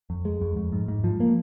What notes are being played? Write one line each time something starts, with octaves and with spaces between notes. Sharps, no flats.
F2
G#3
F2
F2
G#2
G#2
F3
A#3